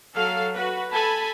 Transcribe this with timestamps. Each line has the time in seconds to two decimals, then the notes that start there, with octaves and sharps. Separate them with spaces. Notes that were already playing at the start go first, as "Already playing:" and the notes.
0.14 F#3 A4 F5
0.53 F#4 B4
0.91 A4 G#5 A5 B5